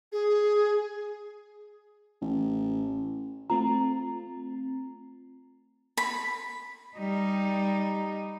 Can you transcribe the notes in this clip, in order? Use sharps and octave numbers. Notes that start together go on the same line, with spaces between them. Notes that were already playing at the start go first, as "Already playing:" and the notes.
G#4
A1
A3 C4 F4 A#5
B5
G3 D#4